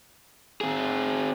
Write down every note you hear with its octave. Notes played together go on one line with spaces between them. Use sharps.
C4 G#4